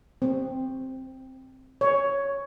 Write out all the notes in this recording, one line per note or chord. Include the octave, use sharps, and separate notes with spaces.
C4
C#5